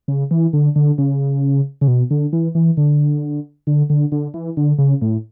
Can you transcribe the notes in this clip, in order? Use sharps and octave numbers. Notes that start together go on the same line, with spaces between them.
C#3
E3
D3
D3
C#3
C#3
B2
D3
E3
E3
D3
D3
D3
D3
E3
D3
C#3
A2